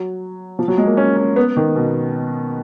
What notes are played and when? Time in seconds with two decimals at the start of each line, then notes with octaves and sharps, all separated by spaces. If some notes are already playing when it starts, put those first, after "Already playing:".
Already playing: F#3
0.59 F3
0.68 F#3
0.78 G#3
0.87 A#3
0.97 C#4
1.17 C#4
1.36 B3
1.56 D#3
1.75 B2